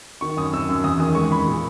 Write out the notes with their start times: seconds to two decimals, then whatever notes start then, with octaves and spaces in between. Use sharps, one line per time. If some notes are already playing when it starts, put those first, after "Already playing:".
0.21 D#3 C#6
0.37 F#2 D#6
0.53 F#2 E6
0.69 F#2
0.84 E2 D#6
1.00 D#3 D#6
1.15 G#3 C#6
1.31 E2 B5
1.47 A#2